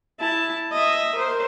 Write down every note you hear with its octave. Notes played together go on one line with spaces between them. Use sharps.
E4 A5
D#5 E5
A#4 C5